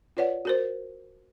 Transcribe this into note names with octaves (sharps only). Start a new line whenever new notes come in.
F4 B4 C#5 D5 F#5
F#4 A#4 C5